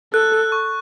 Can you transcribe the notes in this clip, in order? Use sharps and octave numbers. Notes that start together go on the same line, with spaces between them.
A4 F#6
F#6
C#6